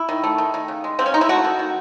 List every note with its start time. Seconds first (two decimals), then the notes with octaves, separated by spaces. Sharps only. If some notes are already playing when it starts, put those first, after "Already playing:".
Already playing: E4
0.09 D#3
0.24 A3
0.38 D#3
0.54 D#3
0.68 C#3
0.84 G#3
0.99 C#3 C4
1.06 C#4
1.14 G#3 D#4
1.21 E4
1.29 A3 F#4
1.44 D#3
1.59 D#3